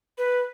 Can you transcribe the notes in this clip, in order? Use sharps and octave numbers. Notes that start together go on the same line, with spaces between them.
B4